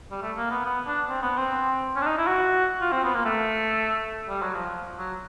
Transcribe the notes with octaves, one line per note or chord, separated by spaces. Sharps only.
G3
A3
A#3
B3
B3
D4
C4
B3
C4
C#4
D4
D#4
E4
F#4
F4
C4
B3
A#3
A3
G3
F#3
F3
F#3